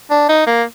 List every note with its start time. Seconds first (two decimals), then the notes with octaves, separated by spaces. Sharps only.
0.10 D4
0.29 D#4
0.46 A#3